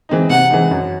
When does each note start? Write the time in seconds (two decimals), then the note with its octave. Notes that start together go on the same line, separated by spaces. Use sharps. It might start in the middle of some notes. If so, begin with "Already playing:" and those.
0.09 E3 G#3 C4 D#4
0.30 C3 F#5
0.50 E3 G#3 C4 D#4
0.71 F#2